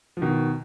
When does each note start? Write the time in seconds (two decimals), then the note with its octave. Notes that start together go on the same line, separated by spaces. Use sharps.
0.17 F3
0.22 B2 D#3